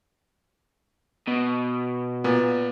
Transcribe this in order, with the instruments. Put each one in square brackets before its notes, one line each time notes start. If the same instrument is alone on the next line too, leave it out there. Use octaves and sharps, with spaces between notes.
[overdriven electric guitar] B2
[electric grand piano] A#2 B3